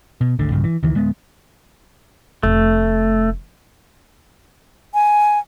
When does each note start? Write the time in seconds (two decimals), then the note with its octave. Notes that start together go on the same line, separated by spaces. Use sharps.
0.21 B2
0.39 G#1 D2 D3
0.50 B1 G2 C#3
0.64 E3
0.83 C#2 D#3 E3
0.95 D1 G#3 B3
2.43 F1 A3
4.94 G#5